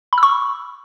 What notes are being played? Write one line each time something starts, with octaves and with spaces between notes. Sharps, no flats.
B5
E6
C#6